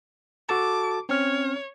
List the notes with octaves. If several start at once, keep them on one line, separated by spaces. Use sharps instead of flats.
F#4 A4 A5 D6
C4 C#4 C#5 F6